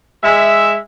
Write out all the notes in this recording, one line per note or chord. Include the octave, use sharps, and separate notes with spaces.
G#3 E5